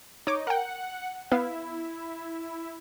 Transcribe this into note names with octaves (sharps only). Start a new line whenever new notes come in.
D#4 C#5 D6
A#4 F#5 G5
B3 E4 B4 F5